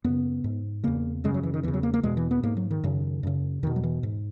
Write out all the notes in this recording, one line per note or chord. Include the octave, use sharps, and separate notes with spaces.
F#2 C#3 B3
G#2
E2 C#3 A#3
F#2 C#3 G#3
F#3
E3
D#3
E2 C#3 E3
F#3
A#3
A#3
E2 B2 G#3
E3
B3
G#2 A#3
F#3
D#3
F#2 C#3
F#2 C#3
E2 B2 D#3
F#3
E3
G#2